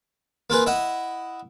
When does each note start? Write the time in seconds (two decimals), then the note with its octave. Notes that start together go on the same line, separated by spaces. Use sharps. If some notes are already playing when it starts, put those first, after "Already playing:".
0.50 A#3 F4 G#4 B4
0.66 E4 D#5 F#5